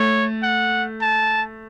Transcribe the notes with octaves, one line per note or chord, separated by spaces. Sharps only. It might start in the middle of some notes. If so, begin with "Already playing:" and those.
Already playing: A3 C#5
F#5
A5